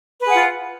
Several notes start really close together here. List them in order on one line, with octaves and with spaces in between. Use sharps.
B4 G#4 F#5 F4